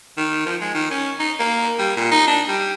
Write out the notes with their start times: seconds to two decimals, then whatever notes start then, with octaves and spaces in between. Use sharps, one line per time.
0.18 D#3
0.46 F3
0.61 G#3
0.75 D#3
0.91 C#4
1.19 D#4
1.40 A#3
1.79 G3
1.97 A#2
2.12 D#4
2.27 D4
2.48 G3